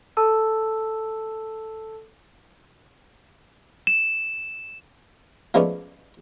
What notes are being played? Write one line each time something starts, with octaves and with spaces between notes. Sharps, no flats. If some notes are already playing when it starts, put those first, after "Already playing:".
A4 A5 E6
E7
F3 G#3 A3 B3 C#4 D4